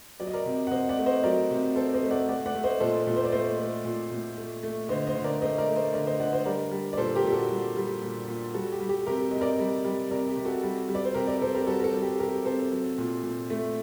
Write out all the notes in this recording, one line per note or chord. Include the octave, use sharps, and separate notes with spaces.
F#3 D5
D#5
A#4 D5
C3
F#5
C3 C5 D#5
D5 F#5
A3
C5 D#5
F#3 A#4 D5
C3
C3 A4 C5
C5 D#5
A3
D5 F#5
A3 D5 F#5
D5 F#5
A3
C5 D#5
A#2 A4 C5
A#2
C5
D5
A3 C5 D#5
A3
A#2
A#2
A3
A3
D3 C5 D#5
C5 D#5
D3
A#4 D5
A3 C5 D#5
A#4 D5
A3
C5 D#5
D3 A#4 D5
C5 D#5
D3 D5 F#5
C5 D#5
G3 A#4 D5
G3
D5
A#2 A4 C5
G4 A#4
A#2
F#4 A4
G3
G3
A#2
A#2
G3 F#4 A4
G4
G3
G4
C3 G4 A#4
C3 D#5
A#4 D5
G3
G3
C3 A#4 D5
G4
C3
F#4 A4
G3
G3
D5
C5
C3 G4 A#4
A#4 D5
C3 A4 C5
G4 A#4
G3 F#4 A4
A#4
F#4 A4
G3
G4
C3 G4 A#4
C3 A4 C5
F#3
A#2
A#2
A3